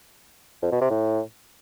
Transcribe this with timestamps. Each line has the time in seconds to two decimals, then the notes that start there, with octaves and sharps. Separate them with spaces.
0.63 F2
0.72 B2
0.81 C3
0.90 A2